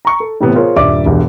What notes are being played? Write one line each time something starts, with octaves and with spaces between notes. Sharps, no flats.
A#5 C#6
A4
A2 C3 E3 B3 C4
F4 G#4 A#4 C5 C#5
D#1 G2 D5 E5 D6
E1 G2